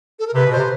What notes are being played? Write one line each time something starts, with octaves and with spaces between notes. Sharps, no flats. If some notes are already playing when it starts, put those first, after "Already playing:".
A4
A#4
C3 B4
B2
C5
C3